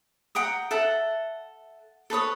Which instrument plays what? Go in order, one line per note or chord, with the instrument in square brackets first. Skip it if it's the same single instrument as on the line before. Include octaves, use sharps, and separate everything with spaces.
[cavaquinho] F#5 G5 A#5 D#6
A4 E5 F#5
A4 B4 C#5 D#6